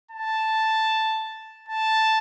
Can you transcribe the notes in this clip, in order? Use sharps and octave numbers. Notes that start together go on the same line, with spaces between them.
A5
A5